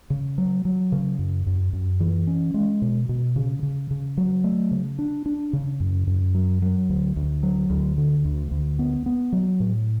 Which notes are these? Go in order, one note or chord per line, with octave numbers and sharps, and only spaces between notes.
C#3
F#3
F#3
C#3
F#2
F#2
F#2
E3
C#4
G#3
B2
B2
C#3
C#3
C#3
F#3
A3
C#3
D4
D4
C#3
F#2
F#2
F#3
F#3
D2
D2
F#3
D2
D3
D2
D2
B3
B3
F#3
A2